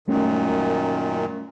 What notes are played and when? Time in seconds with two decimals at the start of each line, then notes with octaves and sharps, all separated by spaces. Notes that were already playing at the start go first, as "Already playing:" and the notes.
0.08 F#2 A#2 D#3 G3 A3 C#4